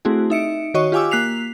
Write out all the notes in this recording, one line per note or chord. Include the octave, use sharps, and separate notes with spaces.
A3 C4 E4 F#4 G#4
D#4 E5 C#7 D7
D#3 F#4 C#5 D#5 C#6
F4 G4 F5 G#5 D6 E6
A#3 F#6 B6 C7 F7